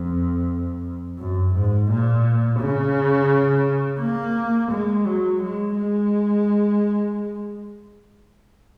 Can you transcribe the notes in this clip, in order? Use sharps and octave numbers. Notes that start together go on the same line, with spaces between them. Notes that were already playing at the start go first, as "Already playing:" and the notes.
Already playing: F2
F#2
G#2
A#2
C#3
A#3
G#3
F#3
G#3
G#3